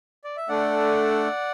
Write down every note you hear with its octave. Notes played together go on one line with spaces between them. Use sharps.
D5
E5
A3 D4 A4 D5 F#5